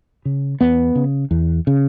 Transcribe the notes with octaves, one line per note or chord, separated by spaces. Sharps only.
C#3
E2 B3
C#3
E2
C#3